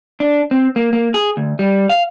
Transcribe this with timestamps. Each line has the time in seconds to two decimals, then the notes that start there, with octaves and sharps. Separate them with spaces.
0.20 D4
0.51 C4
0.76 A#3
0.93 A#3
1.14 G#4
1.37 D2
1.59 G3
1.89 F5